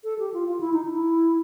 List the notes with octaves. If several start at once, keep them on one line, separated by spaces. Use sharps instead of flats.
A4
G4
F4
F4
E4
D#4
E4